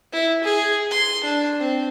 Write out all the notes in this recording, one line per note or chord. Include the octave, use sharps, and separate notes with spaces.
E4
G#4
C6
D4
C4